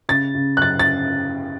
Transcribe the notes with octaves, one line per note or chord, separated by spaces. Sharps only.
C#3 A6
C#3
F#6
F#2 A6
A6